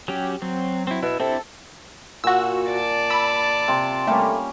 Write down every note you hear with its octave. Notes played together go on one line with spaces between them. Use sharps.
F#3 C#4 G4
F#3 C4
C4 E4
B2 E4
C3 C4 D4 E4 A4
A#2 F#4 E6
D5 A5
B5 E6
C3 C4 C5
G3 A3 A#3 C#4